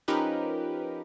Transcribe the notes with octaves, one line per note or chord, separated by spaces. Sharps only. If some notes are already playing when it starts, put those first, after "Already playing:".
F3 C#4 D#4 G4 A#4 B4